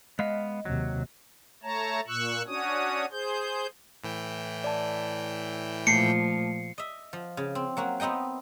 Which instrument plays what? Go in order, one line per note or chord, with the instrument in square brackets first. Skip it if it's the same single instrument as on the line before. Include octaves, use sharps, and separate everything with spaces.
[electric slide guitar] G#3 B3 F5 [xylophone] D#5
[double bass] D#2 C3 [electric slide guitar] F#3
[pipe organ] A3 C#5 A5 A#5
A#2 C#6 E6 F#6
C#4 D4 F#4 C#5 D#6
G#4 C5 G6
[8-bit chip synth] A2 E3 G5
[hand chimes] D5 A5
[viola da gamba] A#2 F3 [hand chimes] A3 A5 [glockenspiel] C7 C#7
[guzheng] D#5 E5
F3
C#3
C4
F#3 A#3 F#4
B3 C4 D#4 D#5 G5